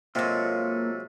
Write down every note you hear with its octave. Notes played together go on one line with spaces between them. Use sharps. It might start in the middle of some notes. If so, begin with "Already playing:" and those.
C3 F#3 G#3 A#3 F4 A4 D#5